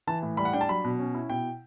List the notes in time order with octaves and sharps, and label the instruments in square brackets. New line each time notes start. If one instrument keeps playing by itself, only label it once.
[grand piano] E3 A5
A2
G3 B5
F#5
D4 G5
A5
F#3 B5
B2
C#4
E4
B2 G5